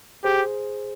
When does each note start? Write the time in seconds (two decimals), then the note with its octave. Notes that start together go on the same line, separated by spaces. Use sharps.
0.24 G4 G#4 C5